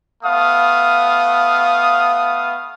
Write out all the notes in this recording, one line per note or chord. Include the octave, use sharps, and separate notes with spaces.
A3 B3 F5 D#6